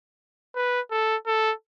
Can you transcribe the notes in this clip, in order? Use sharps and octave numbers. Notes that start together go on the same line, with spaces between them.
B4
A4
A4